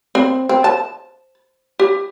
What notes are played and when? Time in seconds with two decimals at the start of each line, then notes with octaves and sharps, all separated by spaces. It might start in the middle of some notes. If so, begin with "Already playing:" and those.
0.15 C4
0.49 C4
0.64 A5
1.80 G4